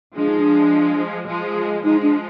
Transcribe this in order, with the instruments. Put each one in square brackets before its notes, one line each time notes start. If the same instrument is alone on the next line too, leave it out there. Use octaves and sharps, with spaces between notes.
[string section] F3 G#3 [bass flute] D4
[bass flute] D#4
D4
[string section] F3 G#3
[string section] F3 G#3 [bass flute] D#4
[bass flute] D4